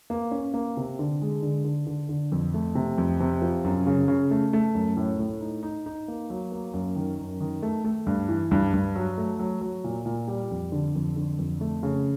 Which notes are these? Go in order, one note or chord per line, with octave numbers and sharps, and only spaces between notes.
A#3
C#4
A#3
C3
D3
G#3
D3
D3
D3
D3
F2
A3
C3
F2
C3
F3
F#2
C#3
C#3
A3
A3
F#2
A2
A2
D#4
D#4
D#4
A#3
F#3
A#3
F#2
D#3
F#2
D#3
A3
A3
G2
E3
G2
G2
F#3
A3
F#3
F#3
A#2
A#2
G3
F2
D3
F2
D3
F2
A3
C#3